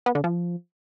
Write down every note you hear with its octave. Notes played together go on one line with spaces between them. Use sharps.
B3
D3
F3